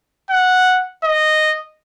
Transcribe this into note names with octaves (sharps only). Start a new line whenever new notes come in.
F#5
D#5